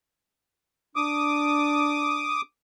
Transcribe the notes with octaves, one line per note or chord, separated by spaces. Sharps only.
D4 D6 D#6